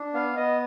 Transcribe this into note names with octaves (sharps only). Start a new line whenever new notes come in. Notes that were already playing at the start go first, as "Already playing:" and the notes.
Already playing: D4
B3 F5
B3 D#5